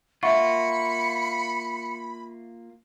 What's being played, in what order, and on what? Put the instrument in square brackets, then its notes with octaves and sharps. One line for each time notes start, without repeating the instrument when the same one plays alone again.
[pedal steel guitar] A#3 F4 [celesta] E5 F#5 C#6 [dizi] B5 [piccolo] C#7